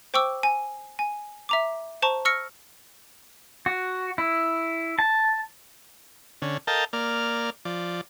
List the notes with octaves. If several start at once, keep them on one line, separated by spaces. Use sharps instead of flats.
C5 G5 C#6 D6 E6
G#5
G#5
E5 A#5 D6
C5 A5 A#5 C#6
C#6 E6 F6 A#6 C#7
F#4
E4
A5
D3 C#4
A4 A#4 D#5 F5 G5 A5
A#3 D5 F6
F3 D5